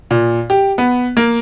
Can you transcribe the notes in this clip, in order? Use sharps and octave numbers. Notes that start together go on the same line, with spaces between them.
A#2
G4
B3
A#3